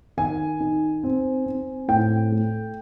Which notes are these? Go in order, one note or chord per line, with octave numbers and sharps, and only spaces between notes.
D#3 G#5
D#4
C4
C4
A2 G5
A3